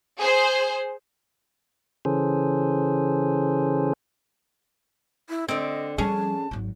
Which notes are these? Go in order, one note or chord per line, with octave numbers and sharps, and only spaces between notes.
G#4 C5
C#3 E3 C#4 G#4 A4 C5
E4
D3 C4 D#5
F3 G3 C#4 G#4 A5
G#1 F#3